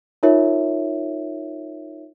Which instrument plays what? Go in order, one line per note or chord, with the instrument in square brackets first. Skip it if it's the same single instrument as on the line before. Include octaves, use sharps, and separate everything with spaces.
[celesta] D#4 F4 A#4 C#5 E5